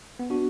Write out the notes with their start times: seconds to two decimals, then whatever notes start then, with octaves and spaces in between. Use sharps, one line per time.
0.19 B3
0.30 D4 F#4